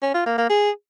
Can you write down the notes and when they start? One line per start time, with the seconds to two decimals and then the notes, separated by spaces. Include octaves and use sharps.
0.02 C#4
0.14 F4
0.26 A#3
0.38 A#3
0.50 G#4